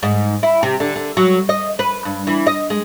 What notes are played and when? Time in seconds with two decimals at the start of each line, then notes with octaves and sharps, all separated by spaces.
0.03 G#2
0.43 E4
0.63 C3
0.80 D3
0.95 D3
1.17 F#3
1.49 D#5
1.79 B4
2.05 G2
2.27 E3
2.47 D#5
2.70 G#3